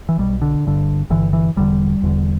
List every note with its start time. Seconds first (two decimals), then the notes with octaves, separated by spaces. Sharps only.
0.09 E3
0.18 B1 B2 G3
0.42 D3
0.65 G1 G2 D3
1.10 G1 G2 D3 E3
1.33 E3
1.56 E1 E2 D3 G3
2.02 E1 E2 D3